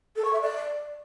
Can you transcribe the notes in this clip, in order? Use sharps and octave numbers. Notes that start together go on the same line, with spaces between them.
A4
C#6
E5
D5